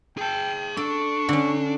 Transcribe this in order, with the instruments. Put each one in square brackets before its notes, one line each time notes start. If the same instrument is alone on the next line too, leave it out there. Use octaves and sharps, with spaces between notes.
[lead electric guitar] G#4 A5 [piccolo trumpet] G5
[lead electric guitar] D4 [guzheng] A4 [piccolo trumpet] C#6
[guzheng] D3 C#4